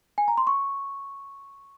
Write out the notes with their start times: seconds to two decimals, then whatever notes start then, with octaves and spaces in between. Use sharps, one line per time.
0.18 G#5
0.28 A#5
0.38 C6
0.47 C#6